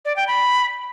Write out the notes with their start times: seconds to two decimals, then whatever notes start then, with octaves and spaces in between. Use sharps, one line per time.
0.05 D5
0.16 G5
0.27 B5